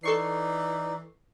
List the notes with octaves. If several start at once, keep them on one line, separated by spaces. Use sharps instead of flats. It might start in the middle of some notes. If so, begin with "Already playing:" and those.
E3 D#4 A4 D5 C#6 C7